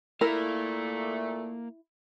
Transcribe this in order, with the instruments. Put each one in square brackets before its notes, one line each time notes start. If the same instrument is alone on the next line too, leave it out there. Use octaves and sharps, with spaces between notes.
[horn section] A#2 A3 [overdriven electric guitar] A#3 F5 [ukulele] E4 [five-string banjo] A#4